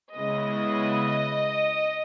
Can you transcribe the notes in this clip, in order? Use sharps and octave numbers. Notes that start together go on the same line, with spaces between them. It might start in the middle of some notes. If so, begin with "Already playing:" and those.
C#3 G#3 B3 E4 D#5